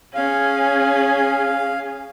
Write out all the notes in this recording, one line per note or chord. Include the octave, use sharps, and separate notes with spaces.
C#4 G#4 F5